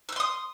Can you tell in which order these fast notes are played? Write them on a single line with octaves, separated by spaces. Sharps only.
E6 G6 C6 D#6